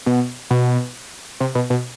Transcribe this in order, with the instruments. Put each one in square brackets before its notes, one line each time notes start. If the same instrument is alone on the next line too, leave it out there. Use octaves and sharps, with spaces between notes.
[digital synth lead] B2
B2
C3
B2
B2